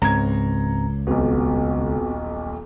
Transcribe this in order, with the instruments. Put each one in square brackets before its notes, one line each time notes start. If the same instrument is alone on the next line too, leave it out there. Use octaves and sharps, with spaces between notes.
[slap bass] C#2 [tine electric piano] G#2 C4 [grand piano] A#5 G#6
[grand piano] D#1 B1 [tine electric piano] B3 C4 F#4